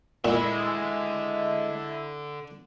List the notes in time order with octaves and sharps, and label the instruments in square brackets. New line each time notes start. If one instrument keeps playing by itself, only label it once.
[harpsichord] A#2 [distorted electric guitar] D3 E5 [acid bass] G#3 [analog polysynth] E4